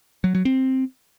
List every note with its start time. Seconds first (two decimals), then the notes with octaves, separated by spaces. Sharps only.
0.24 F#3
0.35 F#3
0.45 C4